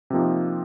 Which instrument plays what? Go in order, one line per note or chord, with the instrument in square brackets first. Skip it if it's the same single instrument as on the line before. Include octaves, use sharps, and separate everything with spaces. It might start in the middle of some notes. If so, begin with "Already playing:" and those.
[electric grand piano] C3 F3 A#3 D#4